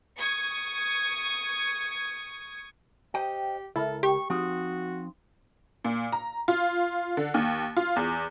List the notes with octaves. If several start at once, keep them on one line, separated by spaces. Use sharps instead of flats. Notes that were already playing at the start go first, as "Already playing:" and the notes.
C#6 D#6 G#6 C#7
G4 C5 D#5 G5
C#2 E4 A4 A#4
G4 C#6
F3 C4 D#4 F#4
A#2
A#5
F4
D3
D#2
F4
E2